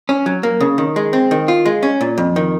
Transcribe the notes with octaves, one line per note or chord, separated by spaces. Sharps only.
C#4
F#3
A#3
C#3
D#3
G#3
C4
D#3
F4
G#3
C#4
A#2
F2
D#3